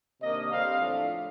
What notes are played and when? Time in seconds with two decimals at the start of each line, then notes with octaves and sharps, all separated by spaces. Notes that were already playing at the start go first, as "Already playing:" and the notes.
0.21 C3 D#3 A#3 D4 D#5
0.51 D3 G3 C4 F5
0.80 A2 F3 A3 D4